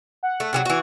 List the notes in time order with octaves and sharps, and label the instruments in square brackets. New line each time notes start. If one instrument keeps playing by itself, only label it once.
[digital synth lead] F#5
[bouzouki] A3
C3 D#3 F#3
E3 F#4